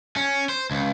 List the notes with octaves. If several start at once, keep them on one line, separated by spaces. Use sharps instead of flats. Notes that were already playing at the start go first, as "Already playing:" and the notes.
C#4
C5
C#2